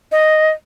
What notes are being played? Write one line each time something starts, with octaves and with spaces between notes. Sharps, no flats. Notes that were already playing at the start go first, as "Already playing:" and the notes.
D#5